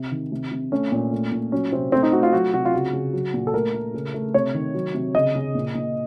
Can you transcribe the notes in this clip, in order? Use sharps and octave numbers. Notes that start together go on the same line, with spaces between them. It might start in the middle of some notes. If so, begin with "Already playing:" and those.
Already playing: C3
D#3
C3
C3
A3 C#4
A#2
A3
A#2
F#3 C#4
C3 C4
A3 C4
D#4
A3 F#4
F4
F#3 F#4
C3 F#4
F4
C#3 F#4
C#3
F#3
A#2
A4
A3 A#4
A3
C#3
A3
C3 C#5
D#3
F#3
C3
C#3 D#5
C#3
A#2
A#2